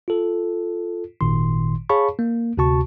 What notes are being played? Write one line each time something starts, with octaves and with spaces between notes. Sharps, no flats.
F4 A4
G#1 A#2 D#3 C6
G#4 C#5 F5 A5 B5 C#6
A#3
D2 C3 F#4 A5 C#6